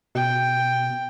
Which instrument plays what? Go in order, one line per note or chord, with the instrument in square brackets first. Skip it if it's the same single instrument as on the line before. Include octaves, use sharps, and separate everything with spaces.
[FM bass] B2 [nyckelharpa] G5